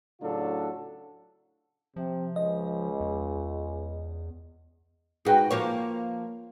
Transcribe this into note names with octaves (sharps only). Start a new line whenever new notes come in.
A2 C#3 F#3 D4 F4 A4
C3 F3
C#2 D#5
E2
G#2 F#4 G#4 B4 G5
F3 A#3 C#5